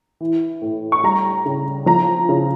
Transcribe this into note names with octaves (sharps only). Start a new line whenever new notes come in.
E3
A2
C#6
G3 A#5
C#3
F3 A#5
C#3